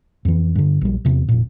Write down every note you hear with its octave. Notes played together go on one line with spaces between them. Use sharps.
F2 E3
G2 D3
A#1 G3
E2 C3
F1 A#2